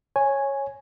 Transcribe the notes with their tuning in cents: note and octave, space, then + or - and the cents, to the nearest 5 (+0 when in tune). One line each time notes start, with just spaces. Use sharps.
C#5 -10 G#5 +0